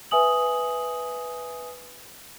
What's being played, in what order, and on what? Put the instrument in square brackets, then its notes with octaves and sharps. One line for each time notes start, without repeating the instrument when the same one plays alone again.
[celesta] B4 E5 G#5 D#6 F#7